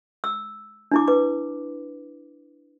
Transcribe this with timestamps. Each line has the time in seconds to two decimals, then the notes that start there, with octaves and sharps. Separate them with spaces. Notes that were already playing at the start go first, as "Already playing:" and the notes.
0.24 E6
0.91 D4 E4 D6
1.08 B4 D6